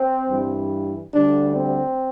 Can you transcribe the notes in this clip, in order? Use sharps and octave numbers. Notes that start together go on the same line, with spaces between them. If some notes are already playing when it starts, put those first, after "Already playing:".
Already playing: C4
G2 E3 G3
D2 D3 G3 D4
C4